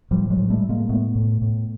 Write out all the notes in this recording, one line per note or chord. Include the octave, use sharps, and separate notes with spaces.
A2 F3 G3
F#3 G#3
A2
G3 A3
A2
G#3 A#3
A2 A3 B3
A2
A2